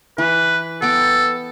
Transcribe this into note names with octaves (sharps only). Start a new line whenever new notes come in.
E3 B4
B3 A4 G5 D6